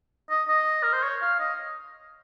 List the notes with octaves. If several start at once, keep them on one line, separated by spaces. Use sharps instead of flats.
D#5
D#5
A#4
C5
C#5
F5
D#5